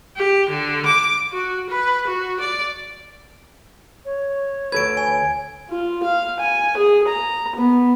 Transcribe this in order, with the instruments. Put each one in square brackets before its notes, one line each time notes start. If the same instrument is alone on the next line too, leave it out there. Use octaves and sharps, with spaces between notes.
[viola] G4
D3
D6
F#4
B4
F#4
D5
[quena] C#5
[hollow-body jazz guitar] D2 A4 B4 [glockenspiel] G#6 D7
[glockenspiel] G#5
[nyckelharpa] F4
F5
G#5
G#4
A#5
B3